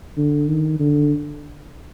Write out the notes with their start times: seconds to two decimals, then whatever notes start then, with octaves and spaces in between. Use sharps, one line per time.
0.18 D3
0.48 D#3
0.79 D3